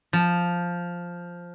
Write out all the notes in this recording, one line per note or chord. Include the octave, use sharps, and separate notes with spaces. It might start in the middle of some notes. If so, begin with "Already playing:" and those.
F3